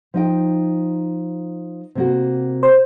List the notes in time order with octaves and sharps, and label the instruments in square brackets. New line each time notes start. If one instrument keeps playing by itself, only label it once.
[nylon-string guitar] F3 D#4 G5
C3 A#3 F#4
[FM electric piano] C5